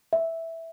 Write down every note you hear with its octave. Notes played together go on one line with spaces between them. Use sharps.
E5